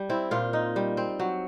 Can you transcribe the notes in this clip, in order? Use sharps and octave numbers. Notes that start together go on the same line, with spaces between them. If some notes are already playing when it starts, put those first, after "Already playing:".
Already playing: G3
C4 E4
A#2 F4
D#4
G3
C4
F#3